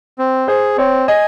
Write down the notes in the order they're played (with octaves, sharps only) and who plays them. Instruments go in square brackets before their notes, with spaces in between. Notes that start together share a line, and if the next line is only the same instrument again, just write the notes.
[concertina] C4
[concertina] G#4 [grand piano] C5
[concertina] C4 [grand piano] C#5
[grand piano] D#5 [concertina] G#5